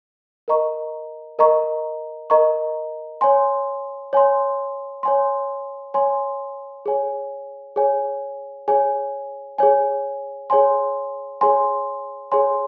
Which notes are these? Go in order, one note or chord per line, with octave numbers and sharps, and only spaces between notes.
A#4 D#5 A#5 C#6
A#4 D#5 A#5 C#6
A#4 D#5 A#5 C#6
C#5 G#5 C6
C#5 G#5 C6
C#5 G#5 C6
C#5 G#5 C6
G#4 C#5 G#5
G#4 C#5 G#5
G#4 C#5 G#5
G#4 C#5 G#5
G#4 C#5 G#5 C6
G#4 C#5 G#5 C6
G#4 C#5 G#5 C6